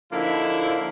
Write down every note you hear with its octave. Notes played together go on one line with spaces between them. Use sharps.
D3 F3 A#3 D#4 E4